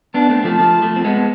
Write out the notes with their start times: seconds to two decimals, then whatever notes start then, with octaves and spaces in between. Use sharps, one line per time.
0.14 B3 D4 A5
0.29 A3 C4
0.44 F3 A3
0.60 F3 A3
0.82 F3 A3
0.96 C4
1.05 G#3 B3